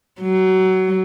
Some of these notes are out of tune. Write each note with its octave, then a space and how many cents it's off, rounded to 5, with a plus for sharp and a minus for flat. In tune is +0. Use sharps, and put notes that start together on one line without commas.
F#3 +20